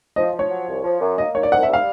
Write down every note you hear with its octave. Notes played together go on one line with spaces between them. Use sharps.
F3 D#5
F3
C#5
F#3
C2
F3
F#2
A#3 D#5
D#3 C#5
D5
C2 F#5
E5
G3 F5